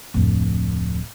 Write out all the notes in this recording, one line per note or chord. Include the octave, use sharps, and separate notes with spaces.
D1 F2